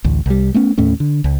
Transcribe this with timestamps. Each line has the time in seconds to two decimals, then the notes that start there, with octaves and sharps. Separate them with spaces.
0.04 A1 D2
0.26 C2 G3
0.54 A3 B3 C#4
0.78 D#2 A2 A3 C#4
1.00 D3
1.24 C#2